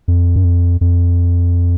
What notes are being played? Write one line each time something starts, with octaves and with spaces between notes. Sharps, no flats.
F2
F#2
F2
F2